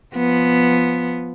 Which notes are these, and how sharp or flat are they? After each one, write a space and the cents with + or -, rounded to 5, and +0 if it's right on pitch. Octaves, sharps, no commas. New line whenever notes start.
F3 +0 B3 +0